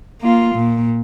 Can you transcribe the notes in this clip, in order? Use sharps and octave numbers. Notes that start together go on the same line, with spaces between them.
A#3 F4
A#2